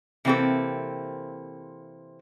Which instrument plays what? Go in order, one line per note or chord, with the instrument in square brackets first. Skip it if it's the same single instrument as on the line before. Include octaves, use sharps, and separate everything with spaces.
[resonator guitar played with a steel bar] C3 E3 A#3 C4 G4 A4